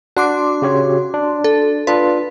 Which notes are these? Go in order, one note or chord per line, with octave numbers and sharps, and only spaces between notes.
D4 F#4 C6 D6
C#3 G4 C#5
D4
A4
D4 F4 B4